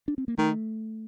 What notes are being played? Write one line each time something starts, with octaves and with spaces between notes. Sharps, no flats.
D4
C4
A#3
D#3 A3